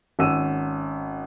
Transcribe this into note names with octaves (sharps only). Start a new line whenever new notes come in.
G#1 C#4 F#5 E6 D#7